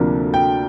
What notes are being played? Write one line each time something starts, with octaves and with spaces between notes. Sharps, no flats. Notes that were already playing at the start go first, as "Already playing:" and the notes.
Already playing: D2 C3 F3 A#3 D4
G5